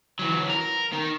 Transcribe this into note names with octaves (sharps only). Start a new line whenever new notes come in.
E3 F#3
A#4
D#3